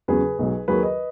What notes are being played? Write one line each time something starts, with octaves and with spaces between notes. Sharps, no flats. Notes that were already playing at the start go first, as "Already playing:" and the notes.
E2 C#3 F#3 G#4 B4
B1 B2 F#3
D#2 D#3 F#3 G#4 B4
B4 D#5